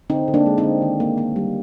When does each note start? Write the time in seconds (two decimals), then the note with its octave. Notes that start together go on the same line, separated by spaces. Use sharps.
0.10 D3 C4 D#4
0.28 D3
0.34 A#3 D4
0.46 G#3
0.58 C4 D#4
0.63 D3
0.82 D#3
1.00 A#3
1.18 A#3
1.36 G3